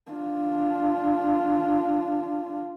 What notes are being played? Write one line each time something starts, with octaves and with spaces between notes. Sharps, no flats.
D4 F4